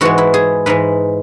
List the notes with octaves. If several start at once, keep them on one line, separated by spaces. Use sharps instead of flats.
G#2 E3 G#3 F#4
E4
G#4
G#2 E3 G#3 B4